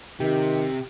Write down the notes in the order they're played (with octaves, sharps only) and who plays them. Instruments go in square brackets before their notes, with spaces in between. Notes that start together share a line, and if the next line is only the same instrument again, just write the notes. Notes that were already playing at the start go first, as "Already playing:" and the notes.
[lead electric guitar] C3 [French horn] D#3 [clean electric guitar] G4